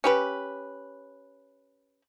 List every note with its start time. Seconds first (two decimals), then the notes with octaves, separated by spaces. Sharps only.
0.04 C#4 G4 B4